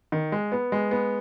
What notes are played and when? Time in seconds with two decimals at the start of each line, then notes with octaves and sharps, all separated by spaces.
0.12 D#3
0.32 G#3
0.52 B3
0.72 G#3
0.91 B3